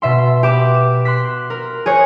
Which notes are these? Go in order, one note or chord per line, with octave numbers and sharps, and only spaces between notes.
B2 E5 C6
G4 B4 D6 E7
E7
C6 F#6 B6
A#4
G#4 C5 C#5 F#6